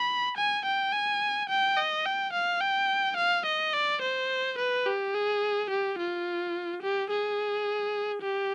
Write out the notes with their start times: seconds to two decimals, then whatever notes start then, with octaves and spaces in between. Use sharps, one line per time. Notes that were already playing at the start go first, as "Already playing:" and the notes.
Already playing: B5
0.37 G#5
0.65 G5
0.93 G#5
1.49 G5
1.77 D#5
2.05 G5
2.33 F5
2.61 G5
3.17 F5
3.46 D#5
3.74 D5
4.02 C5
4.58 B4
4.86 G4
5.14 G#4
5.70 G4
5.99 F4
6.82 G4
7.10 G#4
8.22 G4